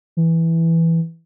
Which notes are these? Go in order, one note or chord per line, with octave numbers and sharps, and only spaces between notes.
E3